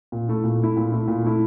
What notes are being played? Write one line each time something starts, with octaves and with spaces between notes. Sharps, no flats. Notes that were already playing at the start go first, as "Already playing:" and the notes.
A#2
A3 E4
A#2
A3 E4
A#2
A3 E4
A#2
A3 E4